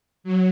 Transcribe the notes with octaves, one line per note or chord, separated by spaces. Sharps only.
F#3